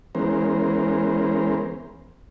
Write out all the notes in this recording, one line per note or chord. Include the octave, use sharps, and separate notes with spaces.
E3 G#3 B3 C#4 A#4 C5